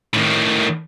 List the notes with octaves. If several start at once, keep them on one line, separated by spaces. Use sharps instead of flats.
A2 D#3